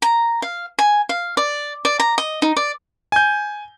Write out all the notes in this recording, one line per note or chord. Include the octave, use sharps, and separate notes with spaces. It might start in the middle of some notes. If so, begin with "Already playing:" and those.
A#5
F5
G#5
F5
D5
D5
A#5
D#5
D#4
D5
G#5 G6